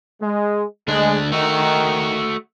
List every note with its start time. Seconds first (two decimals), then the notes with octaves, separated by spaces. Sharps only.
0.22 G#3
0.88 D2 G#3 D4
1.32 D#3 A3 F#4